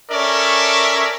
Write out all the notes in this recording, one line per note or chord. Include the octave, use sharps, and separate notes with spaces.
C#4 A4 A#4 C#5 D5 E5